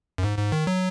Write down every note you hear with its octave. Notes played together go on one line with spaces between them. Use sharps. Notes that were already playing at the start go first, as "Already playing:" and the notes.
F#2
G#2
G#2
D#3
F#3